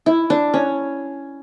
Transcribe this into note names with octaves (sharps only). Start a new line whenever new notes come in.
E4
D4
C#4